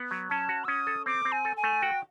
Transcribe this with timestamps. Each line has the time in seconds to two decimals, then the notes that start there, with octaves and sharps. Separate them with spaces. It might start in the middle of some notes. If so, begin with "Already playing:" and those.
Already playing: B3
0.11 F#3
0.30 C#4 A5
0.49 F#4
0.64 E6
0.68 C#4 D#6
0.87 A4
1.06 C4 D6
1.25 C4
1.32 G#5
1.45 A4
1.57 G#5
1.63 A3
1.82 F#4 G5